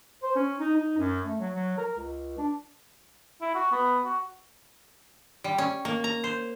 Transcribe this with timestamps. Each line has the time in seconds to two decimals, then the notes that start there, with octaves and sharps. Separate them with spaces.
0.23 C5
0.36 C#4
0.60 D#4
0.76 D#4
0.97 F#2
1.25 A3
1.40 F#3
1.54 F#3
1.77 A#4
1.96 C#2
2.38 D4
3.41 E4
3.55 F#4
3.72 B3
4.05 F#4
5.44 G3
5.58 C#4
5.85 A#3
6.04 A#5
6.24 C5